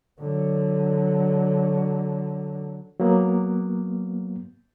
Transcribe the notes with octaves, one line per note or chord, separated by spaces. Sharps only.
D3 F#3
F#3 A#3 B3